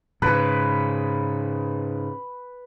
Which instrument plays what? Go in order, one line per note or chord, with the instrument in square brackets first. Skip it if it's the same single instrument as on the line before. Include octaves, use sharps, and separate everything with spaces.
[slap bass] G#2 C#3 [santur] B4